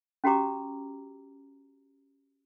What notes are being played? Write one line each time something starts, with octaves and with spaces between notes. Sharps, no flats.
C#4 F#4 G4 A#5 D6